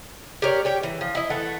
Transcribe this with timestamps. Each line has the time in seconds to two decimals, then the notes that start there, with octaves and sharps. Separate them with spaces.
0.42 G4 A#4 C#5 D5
0.65 G4 C#5 G5
0.83 E3
1.01 F3
1.15 E4 D#5
1.30 E3 A3 F#5